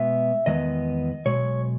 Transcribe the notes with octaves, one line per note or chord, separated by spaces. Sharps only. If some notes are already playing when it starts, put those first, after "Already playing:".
Already playing: B2 G#3 B3 E5
E2 D#3 G#3 B3 D#5
B1 B2 G#3 C#5